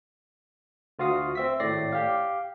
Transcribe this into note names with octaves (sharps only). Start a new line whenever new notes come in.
D2 F4 F#4 F5 D#6
C4 E5 B6
G#1 A2 D5 A#6 C7
G4 F5